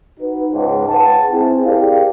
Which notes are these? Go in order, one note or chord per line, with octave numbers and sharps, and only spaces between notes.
D#4 F#4 B4
C#2 G#2
G#4 B4 F#5 G5 A5
C4 E4 G#4
G4 G#4 A#4 D5 F5